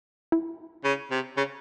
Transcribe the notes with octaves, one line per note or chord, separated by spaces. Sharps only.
E4
C#3
C3
C#3